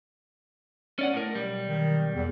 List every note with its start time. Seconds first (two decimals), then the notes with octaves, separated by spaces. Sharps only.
0.99 C#4 D5 F#5
1.14 A2 A#4
1.34 B1 G3
1.68 D#3
2.15 E2